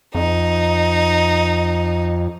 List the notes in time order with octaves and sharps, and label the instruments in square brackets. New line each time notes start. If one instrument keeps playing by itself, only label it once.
[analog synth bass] F2 [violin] D#4